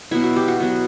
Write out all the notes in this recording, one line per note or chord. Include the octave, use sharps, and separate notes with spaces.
B2 F#3 B3 E4
F#4
G4
F#4
B2 F#3 B3